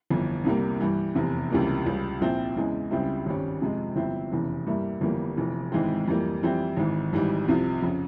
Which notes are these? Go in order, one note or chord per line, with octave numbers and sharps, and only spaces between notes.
G1 F2 E3
C2 C3 G3 A#3
G2 E3 G3
F1 E2 C3
C#2 C3 E3 G3 A#3
C#2 C#3 G3
A#1 A#2 F3 C4 E4
E2 C#3 E3 G#3
C#2 C#3 G3 C4 E4
G#1 G2 G3 C#4
F2 C3 F3 G#3
G1 G2 F3 C4 E4
F1 E2 C#3 E3
G2 G3 A#3 E4
G1 F2 E3 G3 A#3
F1 F2 E3
G#1 G#2 E3 G#3 C4
F2 E3 G3 A#3
F2 E3 G3 C4 E4
G#1 G#2 E3
G#1 G#2 E3 G3
C2 C3 F3
F2 C#3